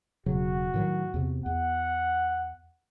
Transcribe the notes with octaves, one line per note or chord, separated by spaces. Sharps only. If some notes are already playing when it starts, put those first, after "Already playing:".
E1 C#3 F#3 F#4
A2 D#3 F#3
E2 C3
E2 F#5